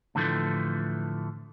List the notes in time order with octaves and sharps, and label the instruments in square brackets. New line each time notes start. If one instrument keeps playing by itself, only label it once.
[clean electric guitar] A2 D3 E3 F3 G3 A3